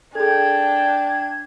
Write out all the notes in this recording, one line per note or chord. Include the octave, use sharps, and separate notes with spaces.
D4 G#4 A4 G5 G#6